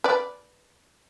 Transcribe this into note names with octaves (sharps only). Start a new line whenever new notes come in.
B4 D5